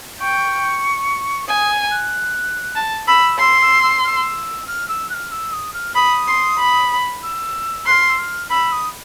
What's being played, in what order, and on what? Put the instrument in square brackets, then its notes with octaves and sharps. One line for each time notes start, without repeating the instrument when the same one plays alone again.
[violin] G5 [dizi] C#6
[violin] G#5 [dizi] D#6
[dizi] F#6
[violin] A5
[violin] B5 [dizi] E6
[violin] C6 [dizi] E6
[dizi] E6
E6
F6
E6
F6
E6
F#6
F6
E6
D#6
F6
[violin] B5 [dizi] D#6
[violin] C6
B5
[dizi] E6
[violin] C6 [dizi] F#6
[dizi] F6
E6
F6
[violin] B5 [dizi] E6
[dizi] D#6